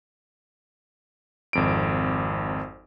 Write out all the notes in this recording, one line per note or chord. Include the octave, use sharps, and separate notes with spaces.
G#1 F2 D7